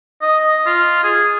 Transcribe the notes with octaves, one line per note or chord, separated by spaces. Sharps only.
D#5
F4
G#4